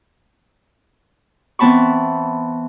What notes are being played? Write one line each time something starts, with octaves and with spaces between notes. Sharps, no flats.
E3 B3 C4 A5 B5 C#6